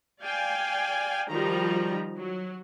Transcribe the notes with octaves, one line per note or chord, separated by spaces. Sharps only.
D5 F5 G5 G#5
D#3 F3 G3 F#4 A#5
F#3